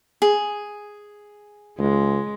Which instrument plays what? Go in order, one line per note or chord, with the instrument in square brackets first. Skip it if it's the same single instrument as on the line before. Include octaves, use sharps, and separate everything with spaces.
[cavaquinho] G#4
[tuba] C#2 [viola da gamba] G#3